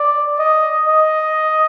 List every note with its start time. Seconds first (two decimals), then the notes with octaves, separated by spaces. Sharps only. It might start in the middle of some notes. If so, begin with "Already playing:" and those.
Already playing: D5
0.39 D#5
0.87 D#5